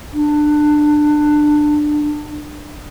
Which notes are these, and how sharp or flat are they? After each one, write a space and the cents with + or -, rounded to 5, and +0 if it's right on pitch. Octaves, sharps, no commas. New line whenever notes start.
D4 +20